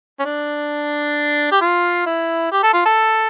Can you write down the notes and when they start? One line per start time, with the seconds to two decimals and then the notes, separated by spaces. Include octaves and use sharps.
0.19 C#4
0.25 D4
1.52 G4
1.61 F4
2.06 E4
2.52 G4
2.63 A4
2.73 F4
2.85 A4